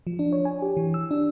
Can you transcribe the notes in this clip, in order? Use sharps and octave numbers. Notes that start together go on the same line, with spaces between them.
F3
D4
C#5
G#5
G4
E3
E6
D4